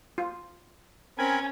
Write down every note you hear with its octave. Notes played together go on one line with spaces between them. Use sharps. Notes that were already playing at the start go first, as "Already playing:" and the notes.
F4
C4 C#4 A#4 G#5 B5